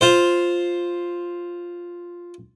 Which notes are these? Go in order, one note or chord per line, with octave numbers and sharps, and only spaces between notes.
F4 C5